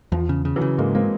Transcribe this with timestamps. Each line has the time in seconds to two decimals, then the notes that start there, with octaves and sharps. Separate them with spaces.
0.12 E2 F3
0.29 C#3
0.45 C#3
0.56 E3 F#3
0.61 C#3
0.78 G#2 G#3 A#3
0.94 G#3 A#3 C4